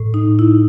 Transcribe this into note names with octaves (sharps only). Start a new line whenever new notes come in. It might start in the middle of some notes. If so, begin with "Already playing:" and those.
Already playing: A2
D#4
E4